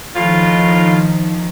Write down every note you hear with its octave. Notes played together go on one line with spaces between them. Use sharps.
A2 D#3 F3 F4